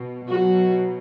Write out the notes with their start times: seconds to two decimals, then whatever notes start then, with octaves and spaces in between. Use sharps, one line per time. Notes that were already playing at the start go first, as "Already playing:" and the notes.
Already playing: B2
0.29 B2 F#3 F#4